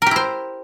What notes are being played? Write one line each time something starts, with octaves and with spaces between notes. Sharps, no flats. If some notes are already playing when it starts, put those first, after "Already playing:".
E4 G4 A#4 C5